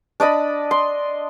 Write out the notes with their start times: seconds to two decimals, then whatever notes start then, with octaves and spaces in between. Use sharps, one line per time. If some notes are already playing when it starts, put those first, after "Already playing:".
0.20 D4 D5 D#5 B5
0.71 C6